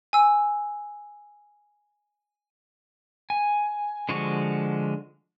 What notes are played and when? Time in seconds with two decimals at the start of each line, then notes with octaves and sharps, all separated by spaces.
0.13 G#5 E6
3.30 G#5
4.09 D3 F3 G#3 F#4 C#6